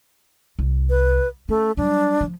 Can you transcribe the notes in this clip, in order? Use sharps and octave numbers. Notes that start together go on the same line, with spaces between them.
C2
B4
A3 C#4
F#3 G3 D4
F3